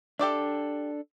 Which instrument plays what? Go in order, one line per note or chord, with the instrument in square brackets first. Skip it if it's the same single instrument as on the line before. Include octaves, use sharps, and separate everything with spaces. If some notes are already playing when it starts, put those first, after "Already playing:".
[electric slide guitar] D4 A4 [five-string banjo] G4 D5 E5